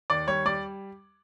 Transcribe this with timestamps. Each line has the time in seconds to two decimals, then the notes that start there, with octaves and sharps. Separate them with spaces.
0.10 D#2 D5
0.28 G3 C#5
0.46 G3 D5